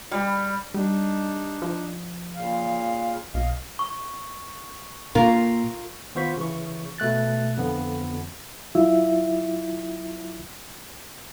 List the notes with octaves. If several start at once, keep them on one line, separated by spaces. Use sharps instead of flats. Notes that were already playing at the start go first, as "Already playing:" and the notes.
G3
G3 D4 D#4
F3
A#2 C#3 F5
B1 D#5 F5
C#6
A#2 F4 A#4
D#3 B3 F4 C5 C#6 B6
C#3 E3 C#6
B2 A3 F#6 A6
F2 D3 B3
F#3 E4 F4 E5